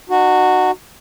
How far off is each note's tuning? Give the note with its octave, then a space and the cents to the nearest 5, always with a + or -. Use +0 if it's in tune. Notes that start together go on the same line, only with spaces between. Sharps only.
D#4 -45 F#4 +0